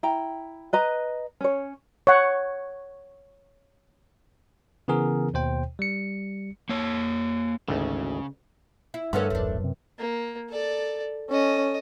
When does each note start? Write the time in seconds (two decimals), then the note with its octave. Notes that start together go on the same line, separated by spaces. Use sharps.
0.03 E4 G5 A#5
0.73 B4 D#5 A#5
1.41 C#4 C#5
2.07 C#5 F#5
4.88 C#3 E3 B3 G#4 A#4
5.34 D#2 B2 C5 G5
5.79 G3 C#7
6.69 A#3 C#5
7.68 G#1 D2 C#3
8.94 E4
9.13 G2 D3 A3 C#4 A#4 B4 C6
9.30 D#1 A1 F#2 A3 D4
9.60 F#2 C3
9.98 A#3
10.49 A4 D5
11.30 C#4 A4 D#5